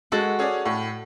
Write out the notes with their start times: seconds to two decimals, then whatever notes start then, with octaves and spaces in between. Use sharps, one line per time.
0.12 G#3 F#4 A4
0.39 C#4 G#4 D5
0.65 A2